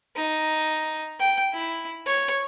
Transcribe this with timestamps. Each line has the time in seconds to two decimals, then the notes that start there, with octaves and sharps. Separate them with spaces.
0.16 D#4
1.20 G5
1.53 E4
2.06 C#5